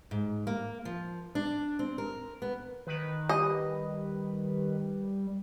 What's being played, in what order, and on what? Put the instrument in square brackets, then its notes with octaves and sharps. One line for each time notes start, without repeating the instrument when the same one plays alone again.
[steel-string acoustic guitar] G#2
A#3
F3
D4
C4
A#4
B3
[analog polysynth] D#3 B4
[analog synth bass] G3 [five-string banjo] D#5